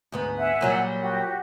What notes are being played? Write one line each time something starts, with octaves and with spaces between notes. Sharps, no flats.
D2 G#2 B3
E5 F#5 G#5
A#2 F#3 G3
F#4 G4